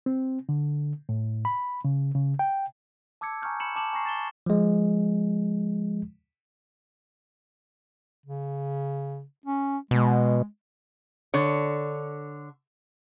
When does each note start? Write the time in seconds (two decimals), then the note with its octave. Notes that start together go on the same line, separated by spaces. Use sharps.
0.06 C4
0.49 D3
1.09 A2
1.45 B5
1.85 C#3
2.15 C#3
2.39 G5
3.21 A5 D6 E6 G#6 C#7
3.42 G#5 A#5 C#6 F6 G6
3.60 B5 C#7 E7 F#7
3.76 A5 D6 E7 F#7
3.93 G#5 A#5 C#6 A#6 C7
4.06 A6 E7 G7
4.46 F3 G#3
8.26 C#3
9.45 C#4
9.91 B2 G#3
11.34 D3 C#5